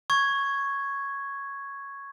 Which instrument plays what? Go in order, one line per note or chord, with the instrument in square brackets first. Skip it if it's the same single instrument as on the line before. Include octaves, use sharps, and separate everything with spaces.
[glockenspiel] C#6 G#6